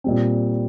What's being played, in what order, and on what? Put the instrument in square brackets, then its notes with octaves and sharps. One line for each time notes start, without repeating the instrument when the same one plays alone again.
[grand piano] A#2 G3 C4